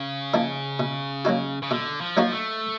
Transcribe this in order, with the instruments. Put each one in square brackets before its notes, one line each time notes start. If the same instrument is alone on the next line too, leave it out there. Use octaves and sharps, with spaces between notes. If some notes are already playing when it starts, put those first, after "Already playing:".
Already playing: [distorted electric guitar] C#3
[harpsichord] F3 A#3 D#4
B2
F#3 A#3 D#4 F#4
[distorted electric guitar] C#3
[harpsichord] B2 [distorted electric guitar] D3
[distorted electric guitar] F3
[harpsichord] F#3 A#3 D#4 F#4
[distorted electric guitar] A3